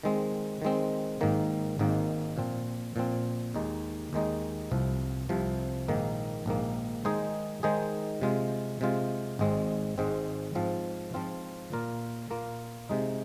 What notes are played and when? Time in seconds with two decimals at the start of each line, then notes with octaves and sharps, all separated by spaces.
0.03 D#3 G#3 C4
0.62 D#3 G#3 C4
1.21 G#1 G#2 D#3 A#3
1.79 G#1 G#2 D#3 A#3
2.37 A#2 F3 C4
2.96 A#2 F3 C4
3.54 D#2 D#3 G#3 D#4
4.13 D#2 D#3 G#3 D#4
4.71 C2 C3 F3
5.29 C2 C3 F3
5.88 A#1 G#2 D#3 A#3
6.46 A#1 G#2 D#3 A#3
7.05 D#3 G#3 D#4 G#4 C5
7.63 D#3 G#3 D#4 G#4 C5
8.21 C3 G#3 F4
8.81 C3 G#3 F4
9.39 G#1 G#2 G#3 C4
9.98 G#1 G#2 G#3 C4
10.55 G#2 F3 C4 F4
11.14 G#2 F3 C4 F4
11.72 A#2 A#3 F4 A#4
12.30 A#2 A#3 F4 A#4
12.89 C3 G#3 D#4